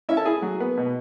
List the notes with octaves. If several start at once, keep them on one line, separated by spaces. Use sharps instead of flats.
C#4 E4 E5
A4 A5
E4 G#4 G#5
F#3
B3
B2